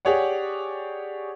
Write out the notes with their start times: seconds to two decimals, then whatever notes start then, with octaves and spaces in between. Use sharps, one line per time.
0.05 G4 G#4 C#5 D5 F#5